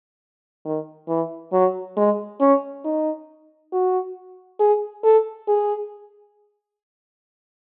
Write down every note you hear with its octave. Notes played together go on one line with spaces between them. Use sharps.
D#3
E3
F#3
G#3
C#4
D#4
F#4
G#4
A4
G#4